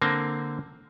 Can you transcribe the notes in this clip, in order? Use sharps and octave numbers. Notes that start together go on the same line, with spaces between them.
D3 A#3 C4